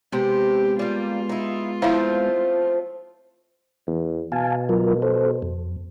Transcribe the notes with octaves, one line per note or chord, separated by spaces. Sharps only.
C3 G#3 B3 C4 G4
G3 A#3 F4
D#4 E4
F3 A3 C4 E4 E5 F5
E2
B2 F5 G#5 A5
F#3 F4 A#4
A4 C5
F2